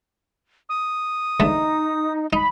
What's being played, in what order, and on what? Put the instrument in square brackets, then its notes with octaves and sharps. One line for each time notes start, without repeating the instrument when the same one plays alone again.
[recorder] D#6
[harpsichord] E2 D3 A3 [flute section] D#4
[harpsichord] D#4 [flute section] B5